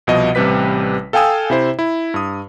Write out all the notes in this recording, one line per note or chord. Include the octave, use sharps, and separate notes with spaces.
C2 B2 F3 D#5
A1 C3 G3 G4 B4 B6
A4 F5 G5 G#5 D#6 E6
C3 E4 C5
E4
G2 D#6